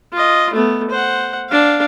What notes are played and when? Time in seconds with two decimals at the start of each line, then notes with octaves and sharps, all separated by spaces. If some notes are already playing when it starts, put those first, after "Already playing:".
0.13 F4 D#5
0.53 A3 B3
0.90 C5 F#5
1.49 D4 F5